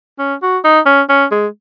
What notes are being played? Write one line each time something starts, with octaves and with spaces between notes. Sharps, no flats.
C#4
F#4
D#4
C#4
C#4
G#3